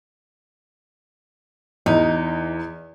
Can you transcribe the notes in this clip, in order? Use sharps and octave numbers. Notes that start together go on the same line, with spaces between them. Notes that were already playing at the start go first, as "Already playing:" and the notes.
E2 D#4